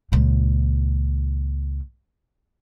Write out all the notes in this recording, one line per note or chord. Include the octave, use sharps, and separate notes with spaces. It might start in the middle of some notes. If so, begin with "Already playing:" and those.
C#2 A#2